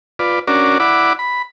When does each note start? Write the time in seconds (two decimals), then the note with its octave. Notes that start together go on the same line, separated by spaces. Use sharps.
0.19 F4 B4 D5
0.47 C#4 D4 F#4 A#4 D5
0.80 E4 D5 F#5 B5 D6
1.19 B5